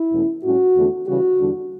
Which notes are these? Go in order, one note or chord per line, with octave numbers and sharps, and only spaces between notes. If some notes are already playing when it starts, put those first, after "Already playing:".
Already playing: E4
E2 B2 A3 C#4
A2 G3 C#4 F#4
E2 D3 A3 D4
C#3 E3 G3 F#4
E2 D3 G3 D4